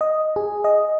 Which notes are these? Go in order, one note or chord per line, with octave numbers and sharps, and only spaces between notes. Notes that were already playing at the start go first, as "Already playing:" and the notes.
D#5
G#4
D#5